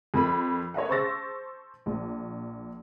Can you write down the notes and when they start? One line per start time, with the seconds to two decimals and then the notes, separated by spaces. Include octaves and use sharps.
0.14 F2 A#4 B5
0.74 C#5 D#5 E5 F#5
0.89 C5 A5 C#6 E6 A6 A#6
1.86 A#1